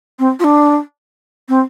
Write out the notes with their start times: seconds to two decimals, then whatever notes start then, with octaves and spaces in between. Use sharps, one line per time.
0.19 C4
0.40 F4
0.44 D4
1.49 C4